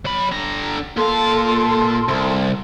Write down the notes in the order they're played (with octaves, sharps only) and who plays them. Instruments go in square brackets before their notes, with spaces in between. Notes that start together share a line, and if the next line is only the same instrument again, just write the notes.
[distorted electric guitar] F#3 B5
D3 A#5
[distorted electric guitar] A#2 F5 [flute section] A4 A5 C6
[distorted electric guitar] C2